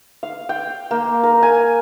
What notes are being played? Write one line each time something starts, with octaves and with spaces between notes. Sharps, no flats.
F5
G5
A#3
A#4
G#5